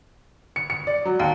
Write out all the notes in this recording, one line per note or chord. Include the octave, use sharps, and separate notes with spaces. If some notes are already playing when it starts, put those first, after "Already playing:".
C#7
C#7
D5
F#3
D#2